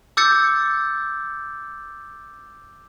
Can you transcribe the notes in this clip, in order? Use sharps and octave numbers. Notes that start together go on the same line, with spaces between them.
D6 E6 G6 A6 C#7